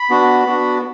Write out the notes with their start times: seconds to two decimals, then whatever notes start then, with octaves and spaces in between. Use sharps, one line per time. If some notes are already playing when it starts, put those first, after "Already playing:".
Already playing: B5
0.10 B3 D4 F#4
0.46 B3 D4 F#4